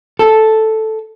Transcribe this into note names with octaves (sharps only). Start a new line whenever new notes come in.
A4